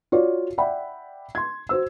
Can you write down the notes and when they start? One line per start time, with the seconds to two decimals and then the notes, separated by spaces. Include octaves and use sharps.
0.12 F4 F#4 C#5 D5
0.58 D5 E5 F#5 G5 B5
1.35 C6 G#6
1.69 F#4 C5 E6